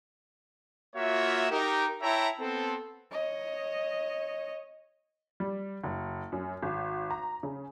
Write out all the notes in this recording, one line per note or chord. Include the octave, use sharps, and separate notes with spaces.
A#3 F4 F#4 C#5 E5
D#4 G4 A#4
E4 C#5 E5 G5 A5 A#5
B3 C4 A4
C#5 D#5
G3
F#1
F#2
G#1
A#5
C#3